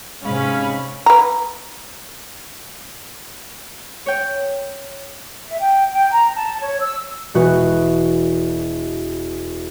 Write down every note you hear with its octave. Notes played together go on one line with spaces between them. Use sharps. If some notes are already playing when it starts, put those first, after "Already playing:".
G#2 C3 G#3 C#4 F5 B5
B4 A#5
C#5 G5
E5
G5
G5
A#5
A5
C#5
E6
E1 F#4 B4